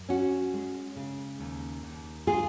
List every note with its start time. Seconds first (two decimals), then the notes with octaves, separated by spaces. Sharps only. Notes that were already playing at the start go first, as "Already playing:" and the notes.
Already playing: F#2
0.09 C#4 F#4
0.53 G#3
0.96 C#3
1.39 D#2
1.83 D#2
2.27 G#3 F4 G#4